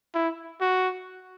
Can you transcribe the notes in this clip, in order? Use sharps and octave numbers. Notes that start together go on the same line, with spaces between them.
E4
F#4